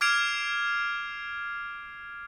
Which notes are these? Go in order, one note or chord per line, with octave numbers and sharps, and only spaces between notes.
D6 F6 G#6 C7 D7 F7